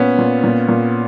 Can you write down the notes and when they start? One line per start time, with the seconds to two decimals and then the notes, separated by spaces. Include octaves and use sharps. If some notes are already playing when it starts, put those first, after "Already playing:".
Already playing: A#2 B3 C#4
0.18 A#2
0.44 A#2
0.69 A#2